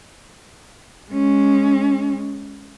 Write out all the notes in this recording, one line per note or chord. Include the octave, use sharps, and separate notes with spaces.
G#3 C#4